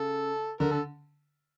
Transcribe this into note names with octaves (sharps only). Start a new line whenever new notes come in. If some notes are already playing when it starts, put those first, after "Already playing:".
Already playing: C#3 A4
D3 A#4
A4